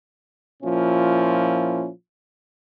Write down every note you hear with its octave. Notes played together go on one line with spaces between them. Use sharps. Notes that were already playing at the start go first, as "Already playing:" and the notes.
A#2 F3 C#4 E4